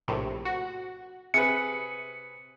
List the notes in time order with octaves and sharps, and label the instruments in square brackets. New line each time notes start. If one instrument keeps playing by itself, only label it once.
[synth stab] A#1 A2 C3
F#4
[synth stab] C3 [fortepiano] G#4 B4 [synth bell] C#7